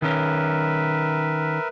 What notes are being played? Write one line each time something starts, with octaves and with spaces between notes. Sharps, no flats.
D#3 C#4 A#4 B4 E5